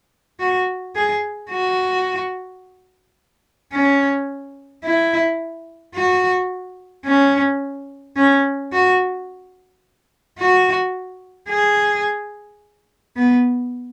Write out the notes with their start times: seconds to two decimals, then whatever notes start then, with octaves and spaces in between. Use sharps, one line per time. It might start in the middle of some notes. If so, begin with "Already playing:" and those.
0.40 F#4
0.95 G#4
1.51 F#4
3.73 C#4
4.84 E4
5.95 F#4
7.06 C#4
8.17 C#4
8.73 F#4
10.39 F#4
11.49 G#4
13.16 B3